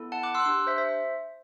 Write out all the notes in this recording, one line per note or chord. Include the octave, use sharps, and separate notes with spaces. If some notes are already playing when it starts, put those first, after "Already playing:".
Already playing: B3 E4 A4
F#5 A5
D6 F#6
C6 E6
F#6
D4 G4 C6 E6
C5 E5
C5 E5